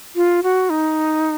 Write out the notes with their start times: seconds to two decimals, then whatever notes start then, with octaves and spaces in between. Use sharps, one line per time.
0.16 F4
0.43 F#4
0.70 D#4